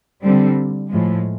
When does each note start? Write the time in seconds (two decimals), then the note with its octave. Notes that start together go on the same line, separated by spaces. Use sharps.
0.22 D3 G3 C4
0.89 A2 F3 G#3